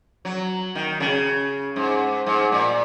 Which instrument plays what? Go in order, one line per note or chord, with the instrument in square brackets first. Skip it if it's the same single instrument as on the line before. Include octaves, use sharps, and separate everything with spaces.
[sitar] F#3
D#3
C#3
G#2
G#2
A#2